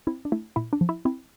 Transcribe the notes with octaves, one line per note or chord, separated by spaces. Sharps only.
C4 E4
D4
A3 E4
A#2 E4
D4
F3
E4
C4 E4